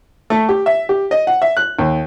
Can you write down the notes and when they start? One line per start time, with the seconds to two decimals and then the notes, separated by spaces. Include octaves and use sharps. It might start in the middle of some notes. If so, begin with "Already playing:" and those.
0.30 A3
0.49 G4
0.66 E5
0.89 G4
1.11 D#5
1.27 F#5
1.42 E5
1.57 F#6
1.79 D#2